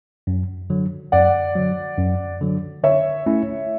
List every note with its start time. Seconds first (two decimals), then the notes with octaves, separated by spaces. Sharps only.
0.27 F#2
0.70 D3 F#3
1.12 F#2 D5 F#5
1.55 D3 F#3
1.98 F#2
2.41 D3 F#3
2.83 D3 C#5 E5
3.26 A3 C#4 E4